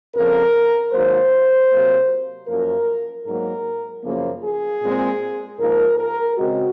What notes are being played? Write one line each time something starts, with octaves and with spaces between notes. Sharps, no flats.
F2 C#3 F3 A#4
G#2 D#3 F#3 A#3 C5
C3 F#3 A#3
F#2 F3 A#3 A#4
G#2 F#3 A#3 A#4
F#2 C#3 F3 A#3
G#4
A#2 G#3 C4
G#2 F3 A#3 A#4
A#4
C#3 G#3 C4 F#4